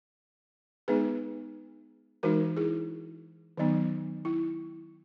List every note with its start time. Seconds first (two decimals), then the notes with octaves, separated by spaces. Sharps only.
0.88 G#3 B3 D#4 G#4 B4
2.23 E3 G#3 D#4 F#4 A#4
2.57 E4 G#4
3.57 D#3 F#3 B3 D#4
4.25 E4